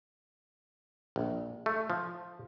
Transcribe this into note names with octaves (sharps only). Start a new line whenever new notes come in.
A#1
A3
F3